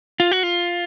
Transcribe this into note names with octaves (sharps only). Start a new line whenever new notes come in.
F4
F#4
F4